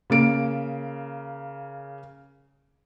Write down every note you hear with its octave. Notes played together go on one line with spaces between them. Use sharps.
C#3 A#3 D7